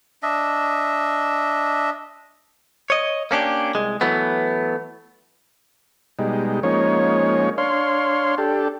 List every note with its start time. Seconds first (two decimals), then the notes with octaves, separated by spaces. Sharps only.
0.23 D4 D#5 E5
2.90 C#5 D#5
3.31 A#3 C#4 D4 G4
3.75 C2 G#3
4.01 E3 F#3 A3 B3
6.19 B2 G3 G#3 D#4
6.63 F3 G#3 A#3 C#4 D#4 C#5
7.58 D4 C#5 F5 C6
8.38 D4 G4 A4